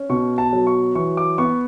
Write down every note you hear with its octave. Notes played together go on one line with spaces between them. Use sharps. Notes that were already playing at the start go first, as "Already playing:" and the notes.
Already playing: C#4
B2 C#6
A5
F#3
C#6
E3 C#6
D6
B3 C#6